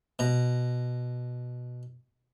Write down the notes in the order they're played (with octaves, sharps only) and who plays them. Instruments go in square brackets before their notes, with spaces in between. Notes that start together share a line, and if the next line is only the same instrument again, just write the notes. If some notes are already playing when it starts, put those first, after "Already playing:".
[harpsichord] B2 A#5